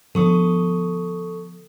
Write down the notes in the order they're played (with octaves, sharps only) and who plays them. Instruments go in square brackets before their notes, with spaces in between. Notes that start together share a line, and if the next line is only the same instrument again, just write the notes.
[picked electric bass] D3 F3 B3 [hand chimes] A4 C#6 D#6